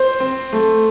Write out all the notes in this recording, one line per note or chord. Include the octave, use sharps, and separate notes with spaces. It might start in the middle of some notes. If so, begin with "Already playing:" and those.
Already playing: C5 C6
C4
A3